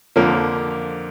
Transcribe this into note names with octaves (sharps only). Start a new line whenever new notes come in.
F2 D3 F3 A#3 A#4